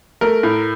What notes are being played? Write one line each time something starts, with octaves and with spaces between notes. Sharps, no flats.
A3 A#4
A2